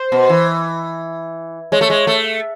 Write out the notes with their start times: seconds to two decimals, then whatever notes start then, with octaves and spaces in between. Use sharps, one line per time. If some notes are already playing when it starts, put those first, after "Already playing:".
Already playing: C5
0.12 B2
0.29 E3
1.72 G#3 C#5
1.81 A3
1.90 G#3
2.07 A3